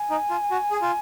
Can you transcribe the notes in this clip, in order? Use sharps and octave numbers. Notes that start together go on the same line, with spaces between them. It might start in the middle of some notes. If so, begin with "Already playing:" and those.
Already playing: G#5
D#4
F4
F#4
G#4
F4